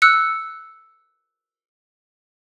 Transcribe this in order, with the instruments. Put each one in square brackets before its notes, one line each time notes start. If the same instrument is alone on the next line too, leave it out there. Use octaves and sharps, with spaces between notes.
[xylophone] E6 F#6 C#7